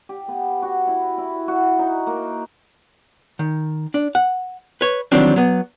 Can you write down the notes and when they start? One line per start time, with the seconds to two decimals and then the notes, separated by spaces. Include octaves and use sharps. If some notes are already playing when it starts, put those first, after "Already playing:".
0.09 G4
0.28 B3
0.62 F#4
0.87 E4
1.18 E4
1.48 F#4
1.79 D#4
2.07 A#3
3.39 D#3
3.94 D4
4.15 F#5
4.81 B4 C#5
5.12 D#3 E3 F#3 G3 C4 D4
5.36 F#3 B3